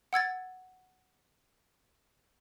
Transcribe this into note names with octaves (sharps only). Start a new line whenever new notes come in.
F#5 E6 G#6 A6